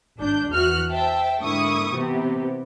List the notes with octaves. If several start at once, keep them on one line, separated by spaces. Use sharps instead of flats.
G#1 D4 G6
E2 E3 F#4 F6 F#6
C5 E5 G5 A5
G#2 D3 A#3 E4 C#6 D#6
C3 E3 B3 G4